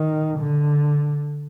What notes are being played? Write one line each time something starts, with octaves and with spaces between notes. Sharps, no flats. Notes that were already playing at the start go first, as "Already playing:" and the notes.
Already playing: D#3
D3